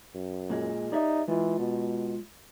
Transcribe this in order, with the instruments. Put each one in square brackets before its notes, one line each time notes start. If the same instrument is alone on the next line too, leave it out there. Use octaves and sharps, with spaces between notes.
[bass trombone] F#2
[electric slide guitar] A#2 G#3
[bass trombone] D#4 [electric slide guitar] G4 D5 E5
[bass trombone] E3 [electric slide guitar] G#3 F4
[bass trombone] B2